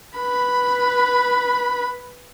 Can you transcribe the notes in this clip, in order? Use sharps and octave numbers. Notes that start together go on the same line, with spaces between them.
B4 B5